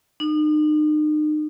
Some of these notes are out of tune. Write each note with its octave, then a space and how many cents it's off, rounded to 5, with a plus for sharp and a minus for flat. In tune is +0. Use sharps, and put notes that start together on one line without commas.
D#4 -40